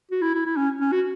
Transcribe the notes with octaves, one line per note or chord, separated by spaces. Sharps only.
F#4
E4
E4
E4
C#4
C#4
F#4